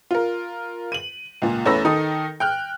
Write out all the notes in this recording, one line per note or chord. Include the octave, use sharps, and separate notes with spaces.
F4 A#4
D#7 F#7
C#2 A#2
E2 A3 C#4 B5 E6 A#6
D#3 D#4 A4 D#6
G5 F6 F#6